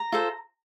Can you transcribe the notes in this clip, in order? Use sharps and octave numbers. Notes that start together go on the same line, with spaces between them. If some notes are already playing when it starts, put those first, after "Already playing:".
Already playing: A#5
F4 A4 C5